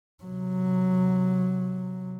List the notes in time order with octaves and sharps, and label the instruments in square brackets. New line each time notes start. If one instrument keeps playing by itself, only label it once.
[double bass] C3 F#3